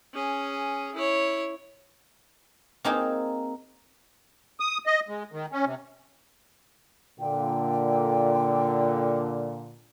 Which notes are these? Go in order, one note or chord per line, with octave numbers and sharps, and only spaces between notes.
C#4 G#4
E4 C#5
A#3 C4 D#4 F4 G#4
D#6
D#5
G#3
D#3
C#4
C3
A#2 D3 G5